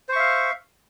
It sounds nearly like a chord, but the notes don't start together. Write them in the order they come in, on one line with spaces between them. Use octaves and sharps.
C5 C#6 E5 F5